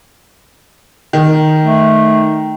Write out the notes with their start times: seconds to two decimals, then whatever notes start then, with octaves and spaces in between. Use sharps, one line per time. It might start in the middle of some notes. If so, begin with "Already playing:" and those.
1.13 D#3
1.62 A3